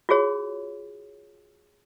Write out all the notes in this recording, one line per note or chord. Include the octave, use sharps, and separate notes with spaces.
F4 F#4 G#4 C#5